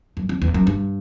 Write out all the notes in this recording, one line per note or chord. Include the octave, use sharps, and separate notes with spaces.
F#2
F2
E2
F#2
G2